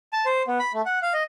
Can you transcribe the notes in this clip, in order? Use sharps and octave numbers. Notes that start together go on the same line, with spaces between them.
A5
C5
B3
B5
A3
F#5
F5
D#5